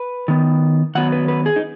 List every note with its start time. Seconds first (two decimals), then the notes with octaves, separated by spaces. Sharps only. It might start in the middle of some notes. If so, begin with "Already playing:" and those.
Already playing: B4
0.28 D#3 B3
0.95 D#3 F#3 B3 F#5
1.12 B4
1.28 B4
1.46 G#4
1.56 D#4